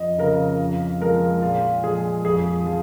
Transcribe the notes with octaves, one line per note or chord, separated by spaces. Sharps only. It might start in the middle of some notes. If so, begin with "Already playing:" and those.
Already playing: F2 D#5
C#3 F3 A#4
F2
F3 G#3 A#4
A#2 F4
F3 G#3 G#4
F2 G#4
F3 F4